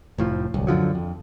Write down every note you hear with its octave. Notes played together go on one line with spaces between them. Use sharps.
F1 A2 F3
D1 C2
F#2 D3 F3 F#3
F2